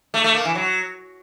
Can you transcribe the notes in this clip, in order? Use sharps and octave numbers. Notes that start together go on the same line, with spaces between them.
A3
A3
A#3
E3
F#3